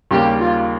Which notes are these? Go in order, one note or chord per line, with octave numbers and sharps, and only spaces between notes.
D#2 C#3 G3 A#3 G4
F4